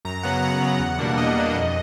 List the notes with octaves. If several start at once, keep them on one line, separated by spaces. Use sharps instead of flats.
F#2 A#5
C#3 F#3 B3 F#5
F#2 F#5
C#3 F#3 B3
E2
B2 G3 A#3 D4
E2 D#5
B2 G3 A#3 D4
F2